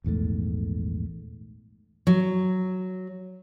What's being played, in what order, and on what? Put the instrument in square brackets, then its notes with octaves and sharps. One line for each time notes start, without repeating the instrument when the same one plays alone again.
[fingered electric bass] A#1 E2 G#2 A3
[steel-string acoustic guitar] F#3